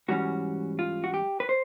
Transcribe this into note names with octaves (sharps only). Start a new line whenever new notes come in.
G#2 E3 G3 A#3 C#4 F#4
F4
F#4
G4
B4
C5